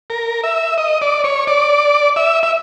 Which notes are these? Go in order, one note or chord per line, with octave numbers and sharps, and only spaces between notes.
A#4
E5
D#5
D5
C#5
D5
E5
E5